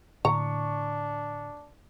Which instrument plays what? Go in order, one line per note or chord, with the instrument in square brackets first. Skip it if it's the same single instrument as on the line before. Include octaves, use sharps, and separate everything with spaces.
[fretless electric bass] A2 D3 [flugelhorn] D4 [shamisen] A#5 [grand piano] C#6